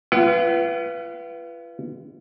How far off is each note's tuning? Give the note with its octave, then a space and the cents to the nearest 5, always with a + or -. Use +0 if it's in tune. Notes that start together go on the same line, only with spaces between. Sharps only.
F4 -40 B4 +0 F#5 +35